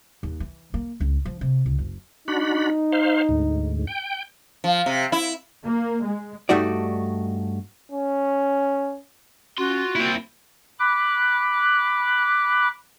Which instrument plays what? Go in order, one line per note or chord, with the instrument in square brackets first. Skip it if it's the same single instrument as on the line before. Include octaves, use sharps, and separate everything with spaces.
[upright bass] D#2
E3
A#3
C#2
F3
C3
C#2
F#1
[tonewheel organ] D4 F#4 B5 [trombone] D#4
[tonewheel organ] C5 F5
D2 G#2
G5
[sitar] F3
C3
E4
[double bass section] A#3
G#3
[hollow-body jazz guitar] G2 A3 D#4 F#4 D5
[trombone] C#4
[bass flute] C#4 [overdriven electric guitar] F4 C6 [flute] F#4
[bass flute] A#3 [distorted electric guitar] C4 E4
[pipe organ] B5 D6 F#6